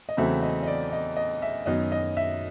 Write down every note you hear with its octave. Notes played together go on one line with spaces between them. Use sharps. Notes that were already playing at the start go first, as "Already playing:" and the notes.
D#5
E2 C#3 F#3 A3 C4 E5
D#5
D#5
D5
D#5
D#5
E5
F#2 D#3 F#3 B3 D#5
D#5
E5